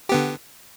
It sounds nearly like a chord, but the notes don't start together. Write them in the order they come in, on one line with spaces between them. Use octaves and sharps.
G4 B3 D3